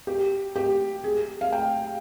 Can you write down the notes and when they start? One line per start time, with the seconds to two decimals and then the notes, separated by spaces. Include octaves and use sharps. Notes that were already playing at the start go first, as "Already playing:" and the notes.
0.07 G4
0.56 G4
1.04 G#4
1.41 F5
1.53 G5